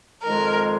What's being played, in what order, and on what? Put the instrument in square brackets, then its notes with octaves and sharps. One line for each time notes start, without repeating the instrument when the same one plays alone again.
[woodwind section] F2 D#3 G#3 [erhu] A#4